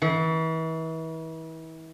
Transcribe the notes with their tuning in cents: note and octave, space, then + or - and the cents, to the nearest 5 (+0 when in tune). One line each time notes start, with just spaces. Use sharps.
E3 -35